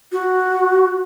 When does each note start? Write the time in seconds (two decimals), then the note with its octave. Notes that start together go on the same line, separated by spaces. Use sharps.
0.12 F#4